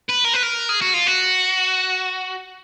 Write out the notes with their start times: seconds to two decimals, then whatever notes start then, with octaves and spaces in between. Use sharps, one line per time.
0.09 B4
0.24 A#4
0.33 B4
0.43 A#4
0.69 G#4
0.81 F#4
0.94 F4
1.07 F#4